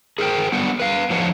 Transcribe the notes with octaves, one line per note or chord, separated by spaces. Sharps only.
G#4 A#4 C5 G5
D3 F#3 G3 B3 F#5
B4 F5
A2 F3 D4 D#4 C#5 F#5